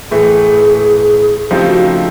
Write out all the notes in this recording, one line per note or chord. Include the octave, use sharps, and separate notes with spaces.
A2 E3 A3 G#4
C#3 F3 A3 C4 D#4 G4
F#4